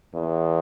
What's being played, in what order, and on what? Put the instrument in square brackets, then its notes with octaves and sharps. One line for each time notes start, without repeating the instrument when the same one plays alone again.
[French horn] E2